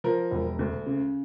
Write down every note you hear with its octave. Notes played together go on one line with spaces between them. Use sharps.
F3 A#4
E1
D2
C#3